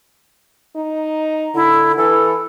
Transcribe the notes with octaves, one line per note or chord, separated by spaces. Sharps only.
D#4
D3 E4
E3 A4